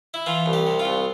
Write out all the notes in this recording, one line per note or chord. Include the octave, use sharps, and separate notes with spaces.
E4
E3 F4
C2
G4
C3
F4
C2